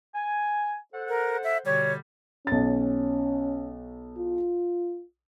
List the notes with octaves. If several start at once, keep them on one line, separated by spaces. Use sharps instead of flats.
G#5
A4 C5 F#5
A#4
E5
B2 D3 G3 C#5
B1 C#4 A6
F4